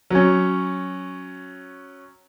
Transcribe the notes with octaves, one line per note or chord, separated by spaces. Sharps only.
F#3 C#4